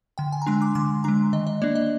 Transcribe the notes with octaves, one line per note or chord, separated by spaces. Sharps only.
D3 G5
G#5
A#5
G#3 D4 C6
D6
D3 C6
G#3 D4 A#5
D#3 D#5
D#5
A#3 D4 D5
D#5